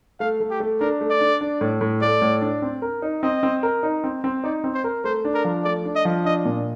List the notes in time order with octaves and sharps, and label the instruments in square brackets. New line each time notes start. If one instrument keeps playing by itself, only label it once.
[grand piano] A3 [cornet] F5
[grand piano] A3
[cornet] G4
[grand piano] A3
[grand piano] D4 [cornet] A#4
[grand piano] A3
[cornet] D5
[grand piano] D4
D4
A2
A2
[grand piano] A3 [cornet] D5
[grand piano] A2
D4
C4
A#4
D#4
[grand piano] C4 [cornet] D#5
[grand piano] C4
A#4
D#4
C4
C4
[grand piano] D#4 [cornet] D5
[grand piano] C4
[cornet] C5
[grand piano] A#4
[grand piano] A3 [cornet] C5
[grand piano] D4
[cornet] A#4
[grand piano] F3
[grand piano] A3 [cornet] D5
[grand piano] D4
[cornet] D#5
[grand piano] F3
[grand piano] D4 [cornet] D#5
[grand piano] A#2